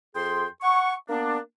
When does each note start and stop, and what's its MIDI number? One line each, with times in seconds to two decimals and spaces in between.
0.15 0.46 41
0.15 0.46 68
0.15 0.46 79
0.15 0.46 84
0.62 0.93 78
0.62 0.93 85
1.09 1.38 58
1.09 1.38 59
1.09 1.38 62